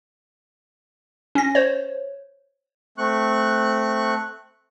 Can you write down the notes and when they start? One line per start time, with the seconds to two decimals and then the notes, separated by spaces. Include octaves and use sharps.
1.35 C#4 A#6
1.55 C5 C#5
2.98 A3 C4 C#6 F#6